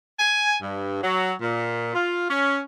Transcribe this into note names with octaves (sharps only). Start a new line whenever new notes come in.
G#5
G2
F#3
A#2
F4
C#4